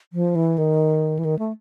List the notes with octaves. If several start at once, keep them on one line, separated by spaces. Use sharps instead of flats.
F3
E3
D#3
E3
D#3
A3